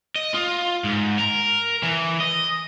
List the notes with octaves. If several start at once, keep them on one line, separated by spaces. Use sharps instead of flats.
D#5
F4
G#2
A#4
E3
D#5